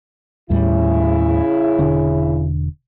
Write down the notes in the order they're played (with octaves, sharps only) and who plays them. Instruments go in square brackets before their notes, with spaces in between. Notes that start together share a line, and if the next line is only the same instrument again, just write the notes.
[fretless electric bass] D#2 A2 G3 [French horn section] C#3 E4
[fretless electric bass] E1 D3 D4